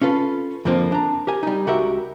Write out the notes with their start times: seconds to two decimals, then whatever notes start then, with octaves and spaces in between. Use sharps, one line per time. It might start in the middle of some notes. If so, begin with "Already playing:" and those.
0.02 C#4 F4 A4 B4
0.65 F2 D3 F3 A#3 C4
0.92 D4 A#5
1.27 G4 A#4 G#5
1.43 G3 D#4
1.67 C#2 F#4 G4 A#4 E5